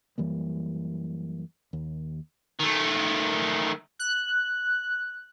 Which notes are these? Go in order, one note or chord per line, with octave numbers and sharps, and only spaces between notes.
F#2 E3 G3 A#3
D#2
D#3 A3
F#6